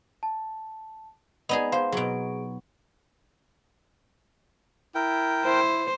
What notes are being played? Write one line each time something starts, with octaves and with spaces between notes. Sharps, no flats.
A5
B3 D#4 G#4 D5 D#5
G#4 C5 F5
B2 F#3 G#4 D7
E4 A#4 G5
E4 C5